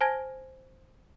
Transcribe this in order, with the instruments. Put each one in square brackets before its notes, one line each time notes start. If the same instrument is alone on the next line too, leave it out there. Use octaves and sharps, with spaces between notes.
[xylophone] C5 G#5 A5 F6 G#6 A#6